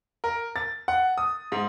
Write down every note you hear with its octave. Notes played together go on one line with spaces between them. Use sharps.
A#4
A6
F#5
D#6
G#2